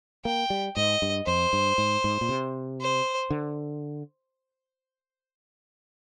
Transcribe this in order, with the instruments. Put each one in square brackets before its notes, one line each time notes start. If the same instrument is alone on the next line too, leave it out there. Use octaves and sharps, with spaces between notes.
[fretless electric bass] A#3 [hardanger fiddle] G5
[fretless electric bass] G3
[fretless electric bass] G#2 [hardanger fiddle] D#5
[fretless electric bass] G2
[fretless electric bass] F2 [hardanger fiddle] C5
[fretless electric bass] G2
G#2
G#2
A#2
C3
[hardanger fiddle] C5
[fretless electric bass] D3